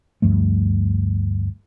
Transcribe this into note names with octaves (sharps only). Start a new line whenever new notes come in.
D2 G2 F3 A3